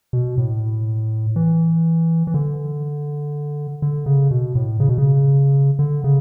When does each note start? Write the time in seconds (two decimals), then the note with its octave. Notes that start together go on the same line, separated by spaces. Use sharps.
0.13 B2
0.38 A2
1.36 E3
2.27 E3
2.34 D3
3.82 D3
4.06 C#3
4.31 B2
4.55 A2
4.80 C#3
4.89 B2
4.98 C#3
5.79 D3
6.04 C#3